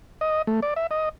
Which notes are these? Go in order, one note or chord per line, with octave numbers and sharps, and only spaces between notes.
D#5
A3
D5
E5
D#5